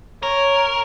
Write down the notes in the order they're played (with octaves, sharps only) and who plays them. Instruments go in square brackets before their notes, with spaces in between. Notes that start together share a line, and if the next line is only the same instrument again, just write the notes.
[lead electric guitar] A#4 [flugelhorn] C#5